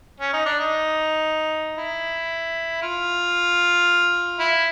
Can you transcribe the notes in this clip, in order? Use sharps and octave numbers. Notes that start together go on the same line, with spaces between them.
C#4
D#4
D4
D#4
E4
F4
E4